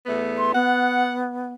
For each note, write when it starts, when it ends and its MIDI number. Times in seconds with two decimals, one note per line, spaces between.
0.06 0.53 40
0.06 0.53 57
0.06 0.53 59
0.38 0.52 84
0.54 1.53 59
0.54 1.22 78